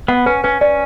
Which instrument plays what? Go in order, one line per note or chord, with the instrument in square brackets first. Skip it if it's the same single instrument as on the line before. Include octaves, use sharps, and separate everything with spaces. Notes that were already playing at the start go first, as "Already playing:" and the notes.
[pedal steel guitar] B3 [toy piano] F#5
[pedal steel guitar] C#4 [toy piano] B4
[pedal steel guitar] C#4 [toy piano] B4
[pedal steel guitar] C#4 [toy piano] D5